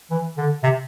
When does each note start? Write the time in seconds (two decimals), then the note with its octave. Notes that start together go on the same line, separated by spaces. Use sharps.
0.11 E3
0.37 D3
0.63 C3